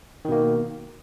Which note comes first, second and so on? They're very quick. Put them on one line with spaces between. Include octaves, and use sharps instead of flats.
D#3 B2 A#3